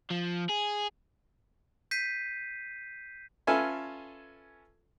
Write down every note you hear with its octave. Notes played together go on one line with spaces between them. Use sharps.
F3
G#4
G6 B6 C7 D#7
C#4 F4 A4 B4 E5 G#5